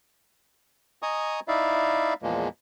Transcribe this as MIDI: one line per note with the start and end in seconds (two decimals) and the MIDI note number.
1.03 1.40 75
1.03 1.40 80
1.03 1.40 82
1.03 1.40 85
1.03 1.40 87
1.48 2.14 63
1.48 2.14 64
1.48 2.14 74
1.48 2.14 76
1.48 2.14 77
2.23 2.49 40
2.23 2.49 46
2.23 2.49 53
2.23 2.49 56
2.23 2.49 58